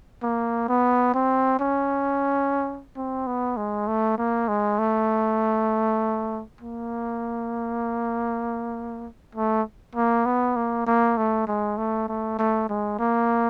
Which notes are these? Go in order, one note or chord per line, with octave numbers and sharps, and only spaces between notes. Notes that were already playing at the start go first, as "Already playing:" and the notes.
A#3
B3
C4
C#4
C4
B3
G#3
A3
A#3
G#3
A3
A#3
A3
A#3
B3
A#3
A#3
A3
G#3
A3
A3
A3
G#3
A#3